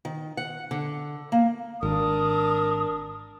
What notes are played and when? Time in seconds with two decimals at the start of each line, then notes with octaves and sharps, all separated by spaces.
0.05 D#3
0.37 F#5
0.71 D3
1.32 A#3
1.83 G#1 D4 A#4 D#6